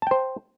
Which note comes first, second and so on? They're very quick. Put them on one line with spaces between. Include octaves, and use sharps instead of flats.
A5 G5 C5